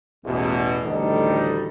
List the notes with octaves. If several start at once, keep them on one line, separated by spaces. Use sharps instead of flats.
A1 E2 B2
A1 D2 D#3 G3 D#4 A4